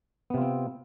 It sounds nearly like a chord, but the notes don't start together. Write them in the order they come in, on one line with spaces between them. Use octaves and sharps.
B3 C3 F4 C4